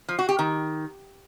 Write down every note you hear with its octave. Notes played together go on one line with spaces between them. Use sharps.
F3
F#4
G4
D#3